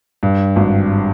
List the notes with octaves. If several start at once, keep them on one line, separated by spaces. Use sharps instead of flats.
G2
G#1